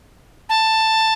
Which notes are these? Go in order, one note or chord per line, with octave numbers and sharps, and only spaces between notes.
A5